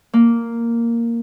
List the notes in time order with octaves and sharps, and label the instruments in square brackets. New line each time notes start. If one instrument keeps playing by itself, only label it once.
[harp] A#3